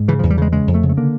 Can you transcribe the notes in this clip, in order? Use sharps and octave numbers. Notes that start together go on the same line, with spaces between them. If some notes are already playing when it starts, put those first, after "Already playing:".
Already playing: G#2
C#3 E3
E2 F3
G3
C#3 G#3
C#3 G#3
F2
A3
C#3
A3
D3 A#3